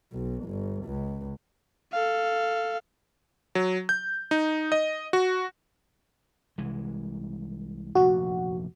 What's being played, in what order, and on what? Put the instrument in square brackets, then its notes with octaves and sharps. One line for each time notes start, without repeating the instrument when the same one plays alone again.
[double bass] B1
G1
C#2
[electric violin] A4 F5
[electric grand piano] F#3
G6
D#4
D#5
F#4
[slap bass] C2 E3 G#3
[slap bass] F1 A#1 D#2 [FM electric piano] F#4